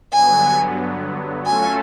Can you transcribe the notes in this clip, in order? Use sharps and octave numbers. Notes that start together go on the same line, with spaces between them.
G2 D3 F#3 B3 G#5
F#3 A3 C#4 F4 A4 G#5